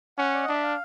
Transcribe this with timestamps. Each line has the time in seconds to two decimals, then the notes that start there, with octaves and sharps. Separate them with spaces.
0.18 C#4 F#5
0.34 D5
0.43 D#5
0.48 D4
0.53 E5
0.63 F5